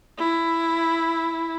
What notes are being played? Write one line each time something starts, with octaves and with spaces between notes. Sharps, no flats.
E4